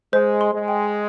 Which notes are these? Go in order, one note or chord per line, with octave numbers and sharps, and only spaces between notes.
G#3 C5
C6
G#3
G5